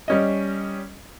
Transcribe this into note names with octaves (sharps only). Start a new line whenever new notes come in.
G3 C#4 D#5